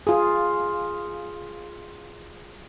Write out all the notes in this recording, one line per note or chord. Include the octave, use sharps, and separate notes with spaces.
F4 G#4